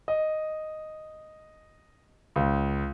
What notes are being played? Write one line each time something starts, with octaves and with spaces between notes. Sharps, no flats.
D#5
C#2